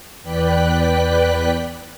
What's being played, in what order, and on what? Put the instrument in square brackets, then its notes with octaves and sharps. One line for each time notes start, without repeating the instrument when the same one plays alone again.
[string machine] E2 B4 D5 G5 F#6 B6